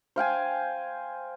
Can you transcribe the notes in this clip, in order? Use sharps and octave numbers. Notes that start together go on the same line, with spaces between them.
C5 F5 G5 G#5